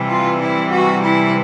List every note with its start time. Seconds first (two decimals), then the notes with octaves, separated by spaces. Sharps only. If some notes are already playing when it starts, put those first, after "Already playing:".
Already playing: C3 E3 G3
0.08 F4
0.40 E4
0.71 F#4
1.02 E4